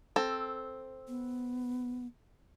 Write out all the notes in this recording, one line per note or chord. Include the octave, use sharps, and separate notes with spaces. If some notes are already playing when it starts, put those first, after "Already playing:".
C4 A4
B3